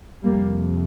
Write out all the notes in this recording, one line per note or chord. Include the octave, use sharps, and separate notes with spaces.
F2 C3 G3 A#3